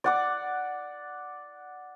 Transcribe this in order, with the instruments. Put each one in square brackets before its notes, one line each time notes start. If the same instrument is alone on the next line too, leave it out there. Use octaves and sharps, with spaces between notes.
[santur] D5 F#5 D6